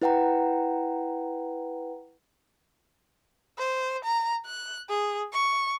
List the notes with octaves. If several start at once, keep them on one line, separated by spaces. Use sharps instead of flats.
E4 B4 F#5 G5 A#5
C5
A#5
F#6
G#4
C#6